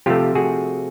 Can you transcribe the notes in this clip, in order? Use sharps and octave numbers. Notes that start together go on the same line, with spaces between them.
C3 F3 A3 F4 G4
F#4 G#4